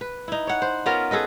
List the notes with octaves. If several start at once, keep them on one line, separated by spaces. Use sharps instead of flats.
B4
D#4 E4
C#5 F#5
C5
B3 C#4 F4 A#4
G#4 A4 B4 D#5